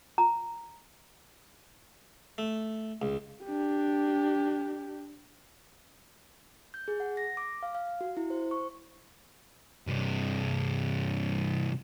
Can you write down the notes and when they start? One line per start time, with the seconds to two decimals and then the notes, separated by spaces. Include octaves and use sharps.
0.18 A#5
2.38 A3
3.02 C#2
3.44 D4 G4
6.74 G6
6.88 G#4
7.00 F#5
7.17 A#6
7.37 D6
7.63 F5
7.75 F5
8.01 F#4
8.17 E4
8.30 C5
8.51 C#6
9.87 G2 C3